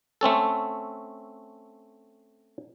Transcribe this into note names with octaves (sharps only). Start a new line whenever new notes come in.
A3 C4 C#4 A4